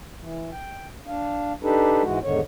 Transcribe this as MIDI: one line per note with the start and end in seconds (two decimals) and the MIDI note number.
0.22 0.51 52
0.53 0.87 79
1.07 1.53 62
1.07 1.53 77
1.63 2.03 62
1.63 2.03 63
1.63 2.03 67
1.63 2.03 69
1.63 2.03 71
2.04 2.19 44
2.04 2.19 52
2.04 2.19 56
2.04 2.19 66
2.24 2.40 40
2.24 2.40 44
2.24 2.40 50
2.24 2.40 51
2.24 2.40 73